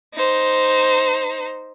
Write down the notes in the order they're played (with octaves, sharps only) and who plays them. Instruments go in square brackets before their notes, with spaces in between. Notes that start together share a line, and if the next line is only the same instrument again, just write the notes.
[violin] D#4 C5